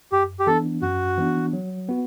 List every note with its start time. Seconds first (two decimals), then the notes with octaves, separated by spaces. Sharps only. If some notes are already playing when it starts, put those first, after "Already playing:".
0.12 F#2 G4
0.40 G4
0.47 E3 B3 D4 A4
0.82 F#2 F#4
1.18 E3 B3 D4
1.53 F#3
1.88 B3 F#4